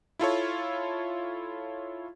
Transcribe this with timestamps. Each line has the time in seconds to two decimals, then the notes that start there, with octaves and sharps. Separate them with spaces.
0.19 E4 F4 A4 C#5